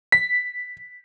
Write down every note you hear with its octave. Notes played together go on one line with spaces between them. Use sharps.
B6